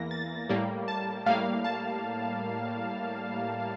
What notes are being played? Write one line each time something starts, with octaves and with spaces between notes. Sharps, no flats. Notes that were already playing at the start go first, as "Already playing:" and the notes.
Already playing: E2 E3 A#3 A#6
A6
A2 G3 A#3
A5
A2 G3 A#3 F5
A5